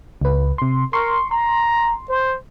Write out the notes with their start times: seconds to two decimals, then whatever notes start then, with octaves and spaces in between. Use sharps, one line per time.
0.21 C#2 B4
0.58 C3 C6
0.93 A#4 C6 C#6
1.31 A#5 C6
2.09 C5